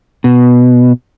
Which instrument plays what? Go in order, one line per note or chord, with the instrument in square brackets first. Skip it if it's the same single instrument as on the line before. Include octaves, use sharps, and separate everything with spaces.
[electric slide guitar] B2